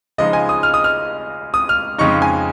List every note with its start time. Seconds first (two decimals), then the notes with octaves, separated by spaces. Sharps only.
0.18 C#3 F3 G#3 D#4 D#5
0.33 G#5
0.49 D#6
0.63 F6
0.74 D#6
0.84 F6
1.54 D#6
1.69 F6
1.98 F2 C#3 G#3 D#4 C#6
2.22 G#5